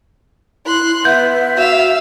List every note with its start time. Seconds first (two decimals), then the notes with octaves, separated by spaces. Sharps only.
0.66 E4 C6 F#6
1.05 B3 E5 F#5 G6
1.57 F#4 F5 E6